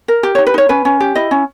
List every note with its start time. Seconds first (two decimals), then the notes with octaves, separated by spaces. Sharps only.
0.08 A#4
0.23 G4
0.35 C#5
0.38 D#4
0.47 B4
0.54 D#4 C#5
0.69 C#4 B4
0.85 C#4
1.00 G4
1.15 E4 D#5
1.31 C#4